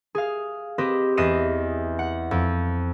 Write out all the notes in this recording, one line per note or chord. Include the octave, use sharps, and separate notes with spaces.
G#4 F5
C4 G4 B4 C5 D#5
E2 B4 D#5 C7 D#7 E7
F#5
F2